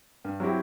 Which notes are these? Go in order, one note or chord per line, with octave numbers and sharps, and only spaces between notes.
G2
F#3 C4 E4 G4